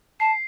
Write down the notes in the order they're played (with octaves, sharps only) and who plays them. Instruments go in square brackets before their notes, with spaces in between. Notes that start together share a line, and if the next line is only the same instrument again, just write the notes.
[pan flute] A5 [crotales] C7